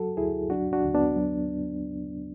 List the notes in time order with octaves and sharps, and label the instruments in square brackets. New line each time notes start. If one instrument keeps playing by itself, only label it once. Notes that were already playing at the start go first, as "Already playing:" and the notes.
Already playing: [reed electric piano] F#3 F#4 A4
D2 E4 G#4
F#3 D4 F#4
D4 F#4
D2
B3 D4
F#3